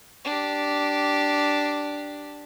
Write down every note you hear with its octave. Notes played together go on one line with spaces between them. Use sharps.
D4 G4